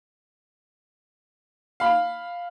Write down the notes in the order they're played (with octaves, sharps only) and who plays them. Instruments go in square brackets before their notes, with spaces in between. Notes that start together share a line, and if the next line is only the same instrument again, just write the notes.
[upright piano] F5 B5